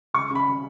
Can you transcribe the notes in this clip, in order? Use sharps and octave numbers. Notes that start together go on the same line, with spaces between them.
C#2 C#6
C#3 B5